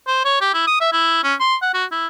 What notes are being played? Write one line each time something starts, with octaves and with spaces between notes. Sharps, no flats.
C5
C#5
G4
E4
D#6
E5
E4
C#4
C6
F#5
F#4
E4